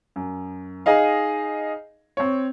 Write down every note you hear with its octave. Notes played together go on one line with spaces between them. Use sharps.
F#2
D#4 G#4 D#5 F5
C4 C#5